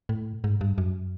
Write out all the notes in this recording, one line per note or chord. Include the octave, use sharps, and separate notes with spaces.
A2
G#2
G2
F#2